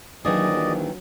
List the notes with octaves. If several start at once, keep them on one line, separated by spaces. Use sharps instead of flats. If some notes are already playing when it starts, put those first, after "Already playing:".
A#1 D#3 E3 F#3 G#4 D5 D#5